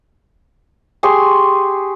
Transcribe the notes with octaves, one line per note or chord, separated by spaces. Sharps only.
G4 G#4 C6 C#6